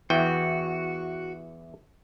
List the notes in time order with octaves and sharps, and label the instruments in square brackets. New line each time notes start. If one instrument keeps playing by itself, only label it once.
[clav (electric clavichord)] E2 E3 G5 [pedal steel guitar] F#4